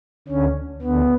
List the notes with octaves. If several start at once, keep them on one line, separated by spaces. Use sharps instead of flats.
D2 D3 C#4
D2 D3 B3